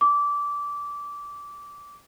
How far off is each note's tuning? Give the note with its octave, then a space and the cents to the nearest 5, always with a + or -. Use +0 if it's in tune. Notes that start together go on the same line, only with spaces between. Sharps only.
D6 -20